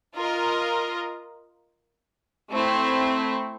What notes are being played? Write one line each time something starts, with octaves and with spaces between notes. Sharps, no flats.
F4 A#4 D#5
A3 C4 E4